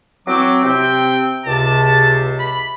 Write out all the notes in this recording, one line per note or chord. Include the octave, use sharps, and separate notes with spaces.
E3 F#3 C4 D6
C3 C4 G5
C#2 C3 A5
B5